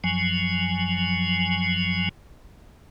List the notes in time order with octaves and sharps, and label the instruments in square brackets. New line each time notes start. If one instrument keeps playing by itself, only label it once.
[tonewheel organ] F#2 F3 F#3 G#5